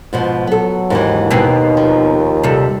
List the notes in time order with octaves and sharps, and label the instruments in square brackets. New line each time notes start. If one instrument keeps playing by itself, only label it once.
[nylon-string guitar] G#2 B2 F3
[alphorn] F#3 [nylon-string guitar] B3 A4
[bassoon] D#2 [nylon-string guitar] G#2 D3 E3
[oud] B2 B3 C4 [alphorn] D#4
[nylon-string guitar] F3
[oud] C3 G3 A4